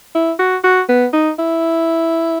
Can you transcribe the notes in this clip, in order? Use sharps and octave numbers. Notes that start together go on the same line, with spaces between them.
E4
F#4
F#4
B3
D#4
E4